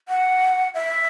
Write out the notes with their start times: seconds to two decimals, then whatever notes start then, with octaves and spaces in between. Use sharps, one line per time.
0.09 F#5
0.75 E5